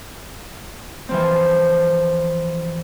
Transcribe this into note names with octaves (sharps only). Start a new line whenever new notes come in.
E3 F3 C4